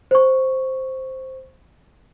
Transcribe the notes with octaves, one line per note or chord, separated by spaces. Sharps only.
C5 C#6